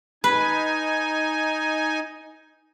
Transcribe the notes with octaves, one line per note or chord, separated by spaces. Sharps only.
D#4 B4 G#5